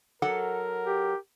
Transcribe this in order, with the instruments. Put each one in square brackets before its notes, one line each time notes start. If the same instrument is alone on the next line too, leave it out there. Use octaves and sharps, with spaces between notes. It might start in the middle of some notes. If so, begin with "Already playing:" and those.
[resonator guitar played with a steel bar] F#3 A4 F#5 [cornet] A#4
[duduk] G4